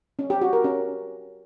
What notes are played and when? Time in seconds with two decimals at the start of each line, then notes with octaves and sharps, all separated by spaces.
0.19 C#4
0.30 G4
0.41 F#4
0.53 A#4
0.64 C#4